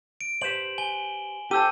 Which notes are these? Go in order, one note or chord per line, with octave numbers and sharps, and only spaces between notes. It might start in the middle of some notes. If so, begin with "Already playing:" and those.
D7
G4 B4 C5 E7 F#7
G#5 G7
G4 A4 C5 A5 E6 D#7